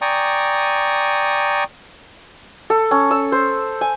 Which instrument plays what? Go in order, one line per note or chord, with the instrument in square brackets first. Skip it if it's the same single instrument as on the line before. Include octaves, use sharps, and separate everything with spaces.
[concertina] D5 G5 G#5 A#5 C#6 D#6
[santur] A4
C#4
E6
C5
G#5